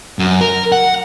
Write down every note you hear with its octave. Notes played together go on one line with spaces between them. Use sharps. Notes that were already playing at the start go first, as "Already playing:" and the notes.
F#2
A#4
F#5